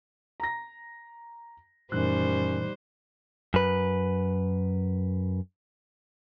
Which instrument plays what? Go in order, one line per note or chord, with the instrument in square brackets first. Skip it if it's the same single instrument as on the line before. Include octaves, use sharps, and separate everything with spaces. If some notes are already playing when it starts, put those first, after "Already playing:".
[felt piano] A#5 A#6
[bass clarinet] F#2 [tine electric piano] A#2 E3 A3 [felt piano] D#3 F#6 [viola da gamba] G3 C5
[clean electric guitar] F#2 B4